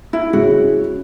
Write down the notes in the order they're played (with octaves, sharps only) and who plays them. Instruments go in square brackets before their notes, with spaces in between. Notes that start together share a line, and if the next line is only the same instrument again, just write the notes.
[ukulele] E4
[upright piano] C#3 G#3 C#4 E4 [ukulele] F#4